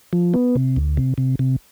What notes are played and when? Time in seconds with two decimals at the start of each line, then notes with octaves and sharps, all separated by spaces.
0.13 F3
0.34 B3
0.55 C3
0.76 D2
0.97 C3
1.18 C3
1.39 C3